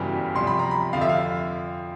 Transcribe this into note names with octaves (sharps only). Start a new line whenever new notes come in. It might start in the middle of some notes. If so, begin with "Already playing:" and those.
Already playing: G1 F#2 C#3 E3 G3
C2 C3 F3 C6
B5
A#5
B5
F2 D3 F3 F5
E5
F5